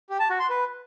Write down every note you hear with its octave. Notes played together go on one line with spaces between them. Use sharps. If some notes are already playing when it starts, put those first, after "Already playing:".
G4
A5
F#4
C6
B4